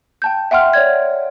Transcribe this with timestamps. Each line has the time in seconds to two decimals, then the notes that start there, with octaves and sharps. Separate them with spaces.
0.22 G5 A5 G6
0.51 E5 F#5 G5 C6 F6
0.73 C#5 D5 G#6